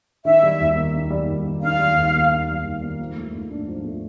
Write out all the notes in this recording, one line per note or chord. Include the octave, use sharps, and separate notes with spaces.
D#3 E5
G3
D#2
A#3
D#3
G3
D#2
A#3
D#3 F5
G3
D#2
A#3
D#3
G3
D#2
A#3
F3
A3
G#2
D4
F3
A3